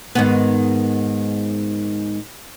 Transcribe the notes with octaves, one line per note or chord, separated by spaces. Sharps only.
G#2 D#3 B3